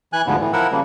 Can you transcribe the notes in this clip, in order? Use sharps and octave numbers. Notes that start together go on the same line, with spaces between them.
E3 G#5 F#6
D2 G#2 D3 F3 B3
A2 E3
F3 E4 A#4 F#5 E6
C#3 F3 G3 A#3